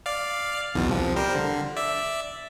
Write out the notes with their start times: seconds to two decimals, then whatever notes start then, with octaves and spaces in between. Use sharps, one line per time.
0.06 D5 F5
0.74 B1 E2 B2
0.89 C2 F3
1.16 G3 A#4 C5
1.34 D3
1.76 D5 E5